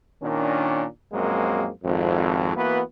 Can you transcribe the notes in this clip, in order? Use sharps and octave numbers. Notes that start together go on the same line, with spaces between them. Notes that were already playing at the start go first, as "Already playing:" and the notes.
A#2 D#3 C#4 D4
A#1 F#2 G#3 A#3 C4
G#1 F2
E3 A#3 B3 F#4 B4